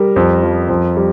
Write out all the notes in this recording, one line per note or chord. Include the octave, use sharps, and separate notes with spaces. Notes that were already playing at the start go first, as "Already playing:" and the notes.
Already playing: G3 A#4
F2
F3
F2
G3